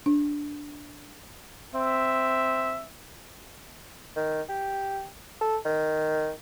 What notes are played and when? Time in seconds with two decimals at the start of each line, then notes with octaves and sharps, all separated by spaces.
0.06 D4
1.74 C4 E5
4.16 D#3
4.49 G4
5.41 A4
5.65 D#3